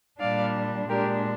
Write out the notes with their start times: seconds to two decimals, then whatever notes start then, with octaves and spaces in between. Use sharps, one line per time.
0.20 A#2 G3 D4 D5 F5
0.89 A#2 G#3 D4 G4 A#4